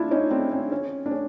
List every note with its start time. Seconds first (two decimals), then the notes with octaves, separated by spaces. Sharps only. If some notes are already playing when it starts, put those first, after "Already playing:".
Already playing: D4 E4 F4
0.11 C#4 D#4
0.31 C4 D4
0.51 C#4
0.72 C#4
1.06 D4
1.11 C#4